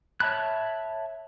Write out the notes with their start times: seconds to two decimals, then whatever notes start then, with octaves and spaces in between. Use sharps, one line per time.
0.20 C#5 E5 A5 B5 F#6